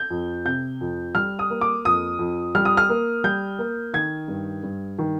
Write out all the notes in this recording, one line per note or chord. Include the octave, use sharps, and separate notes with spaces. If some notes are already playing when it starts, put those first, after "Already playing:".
Already playing: G6
F2
C3 G6
F2
G3 F6
D#6
A#3
D6
F2 D#6
F2
G3 F6
D#6
F6
A#3
G3 G6
A#3
D#3 G#6
G2
G2
D#3